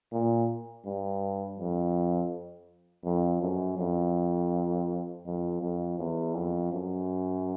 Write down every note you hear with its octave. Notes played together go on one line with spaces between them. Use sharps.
A#2
G2
F2
F2
F#2
F2
F2
F2
E2
F2
F#2